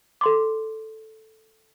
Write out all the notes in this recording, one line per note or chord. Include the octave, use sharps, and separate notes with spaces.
A4 C6 D6